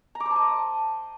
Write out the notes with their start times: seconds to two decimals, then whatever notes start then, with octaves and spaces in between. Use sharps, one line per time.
0.15 A#5
0.20 D6
0.26 C5
0.31 A5
0.36 D#5